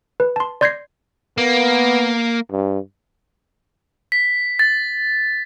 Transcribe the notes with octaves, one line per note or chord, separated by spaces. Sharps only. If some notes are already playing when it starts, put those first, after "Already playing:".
B4
A5 C6
D5 C6 G6 G#6 A#6 C7
A#3 B3
G2
B6
A6